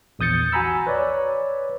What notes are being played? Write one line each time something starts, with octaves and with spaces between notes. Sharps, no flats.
A#1 E2 D#6 G6 A6 C#7
F#4 G#5 A#5 B5 E6
B4 C#5 D5